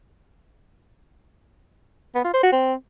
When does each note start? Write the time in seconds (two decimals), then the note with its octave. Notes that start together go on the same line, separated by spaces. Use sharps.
2.15 B3
2.25 F4
2.34 C5
2.43 F#4
2.52 C4